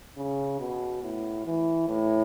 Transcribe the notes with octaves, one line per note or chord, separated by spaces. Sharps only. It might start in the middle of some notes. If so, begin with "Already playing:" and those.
C#3
B2
A2
E3
A2